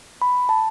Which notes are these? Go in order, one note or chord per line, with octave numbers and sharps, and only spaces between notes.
B5
A5